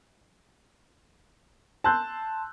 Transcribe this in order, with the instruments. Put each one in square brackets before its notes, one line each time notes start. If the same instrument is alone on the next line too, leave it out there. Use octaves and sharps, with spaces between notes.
[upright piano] A5 C6 E6 F#6 G6